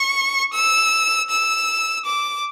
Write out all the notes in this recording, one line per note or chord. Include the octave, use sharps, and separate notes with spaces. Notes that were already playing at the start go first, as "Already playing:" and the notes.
Already playing: C#6
E6
E6
D6